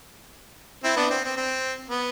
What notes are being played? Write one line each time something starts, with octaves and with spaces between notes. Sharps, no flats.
C4 E4
B3 D4
C4
C4
C4
B3